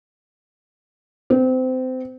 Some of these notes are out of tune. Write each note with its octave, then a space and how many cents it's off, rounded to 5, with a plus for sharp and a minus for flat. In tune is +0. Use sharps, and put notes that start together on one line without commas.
C4 -25